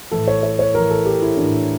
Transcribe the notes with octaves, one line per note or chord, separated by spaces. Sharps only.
A2 E3 A4
C#5
C#5
C#5
A2 E3 A#4
A4
G4
E4
A2 E3 D4